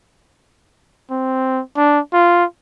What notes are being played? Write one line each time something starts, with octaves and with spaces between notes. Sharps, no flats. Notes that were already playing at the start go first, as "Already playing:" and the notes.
C4
D4
F4